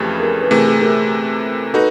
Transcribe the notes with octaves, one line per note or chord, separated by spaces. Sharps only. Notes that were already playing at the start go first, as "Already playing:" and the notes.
Already playing: F2 C#3 E3 A3 G4 A4
G#4 A#4
B4
C3 E3 A3 G#4 A#4
G#4
A4
G#4 A#4
D#4 F#4 A4 B4